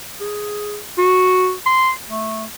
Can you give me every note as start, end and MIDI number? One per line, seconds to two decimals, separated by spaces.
0.21 0.79 68
0.98 1.53 66
1.66 1.92 84
2.09 2.45 57